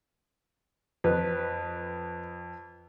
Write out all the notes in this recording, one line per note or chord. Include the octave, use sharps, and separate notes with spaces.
F2 B4